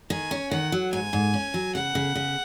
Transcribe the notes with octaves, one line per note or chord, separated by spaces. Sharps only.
D#3 G#5
C#4
D#3 F#5
F#3
G#2 G#5
G#2
C#4
F#3
C#3 F#5
C#3
C#3